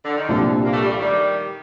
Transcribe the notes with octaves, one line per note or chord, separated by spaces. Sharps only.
D3
D#3
C2 A#2 D3 F3 G3 D4
A#3
A3
G3
F3 A3
D#3 G3